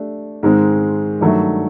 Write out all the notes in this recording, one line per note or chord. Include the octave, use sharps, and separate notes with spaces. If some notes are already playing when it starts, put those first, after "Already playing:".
Already playing: A3 D4 G4
G#2 D#3 G#3 C4 D#4
G2 D#3 F#3 A3